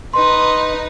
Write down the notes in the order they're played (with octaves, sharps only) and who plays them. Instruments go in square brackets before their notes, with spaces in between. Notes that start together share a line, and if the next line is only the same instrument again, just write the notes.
[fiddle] D#4 B4 [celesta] C6